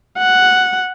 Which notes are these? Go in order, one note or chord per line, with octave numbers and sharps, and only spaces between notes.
F#5